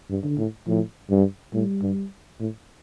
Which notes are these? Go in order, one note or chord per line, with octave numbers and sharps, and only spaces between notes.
G2
D3
A2
A2 F3
G2 G3
A2 G3
G2
A2